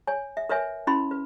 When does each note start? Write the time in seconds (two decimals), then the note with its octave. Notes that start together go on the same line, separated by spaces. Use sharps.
0.07 C#5 G#5
0.37 E5
0.49 A#4 B4 C#5 E5 G#5
0.87 C#4 E4 B5 C6
1.11 B4